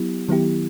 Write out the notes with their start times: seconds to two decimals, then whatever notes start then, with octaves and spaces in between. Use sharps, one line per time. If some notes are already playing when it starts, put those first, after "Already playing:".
Already playing: F#3 B3 E4 G4
0.29 D#3 F#3 B3 E4 G4